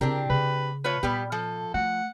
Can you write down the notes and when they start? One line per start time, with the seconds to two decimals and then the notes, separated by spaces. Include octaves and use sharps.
0.01 C#3 C4 D4 E4 G4 A#4
0.30 C#3 B4
0.84 A3 F4 B4 C#5
1.03 A#2 G3 B3 G4
1.32 F3 A4
1.74 A3 F#5